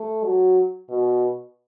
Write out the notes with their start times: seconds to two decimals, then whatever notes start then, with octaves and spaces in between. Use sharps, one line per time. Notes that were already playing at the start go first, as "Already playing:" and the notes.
Already playing: A3
0.25 F#3
0.90 B2